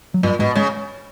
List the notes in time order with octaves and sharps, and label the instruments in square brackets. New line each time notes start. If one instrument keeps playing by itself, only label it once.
[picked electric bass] F#3
[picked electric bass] G2 G3 [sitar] A#2
[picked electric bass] G#2 G#3 [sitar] B2
[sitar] C#3 [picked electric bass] G#3